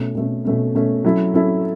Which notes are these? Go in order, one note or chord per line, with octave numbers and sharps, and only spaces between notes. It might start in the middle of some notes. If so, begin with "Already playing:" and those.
Already playing: B2 A3 C#4
B2 A3 C#4
B2 A3 C#4
B2 A3 C#4
F#3 C#4 E4 A4
F#3 C#4 E4 A4